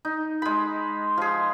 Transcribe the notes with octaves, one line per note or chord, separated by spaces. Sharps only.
D#4
G#3 B5
F3 G#4